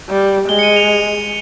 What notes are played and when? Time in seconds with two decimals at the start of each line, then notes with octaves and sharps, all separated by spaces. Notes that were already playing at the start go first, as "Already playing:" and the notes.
0.09 G3
0.49 G#3 G7
0.59 C#7
0.63 D#7
0.76 F7